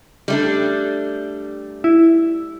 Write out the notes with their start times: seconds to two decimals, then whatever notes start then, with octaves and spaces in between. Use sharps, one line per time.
0.28 G3 A3 D4
1.84 E4